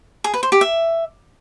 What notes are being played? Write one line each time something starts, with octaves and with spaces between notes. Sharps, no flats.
G#4
B4
C5
G4
E5